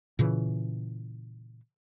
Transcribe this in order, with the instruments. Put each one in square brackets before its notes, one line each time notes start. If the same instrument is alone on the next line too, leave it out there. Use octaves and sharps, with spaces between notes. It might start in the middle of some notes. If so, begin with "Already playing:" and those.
[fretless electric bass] A#2 C#3 E3